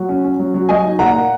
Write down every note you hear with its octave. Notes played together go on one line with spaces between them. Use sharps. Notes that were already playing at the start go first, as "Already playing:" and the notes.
Already playing: F#3 F#5
C#4
C#4
F#3
F#3
F#3 D#5 G#5
D#4
A#2 F#5 A#5
A#3